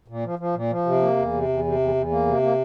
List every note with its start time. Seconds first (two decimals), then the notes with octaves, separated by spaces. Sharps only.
0.08 A#2
0.24 F3
0.39 F3
0.55 A#2
0.71 F3
0.86 C3
1.01 A#3
1.17 E2
1.33 C3
1.48 E2
1.64 C3
1.79 E2
1.95 E2
2.11 A#3
2.26 C3
2.42 A#3